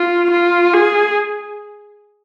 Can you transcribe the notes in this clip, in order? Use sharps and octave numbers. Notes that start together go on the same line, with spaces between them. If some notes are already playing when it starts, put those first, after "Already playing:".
Already playing: F4
F4
G#4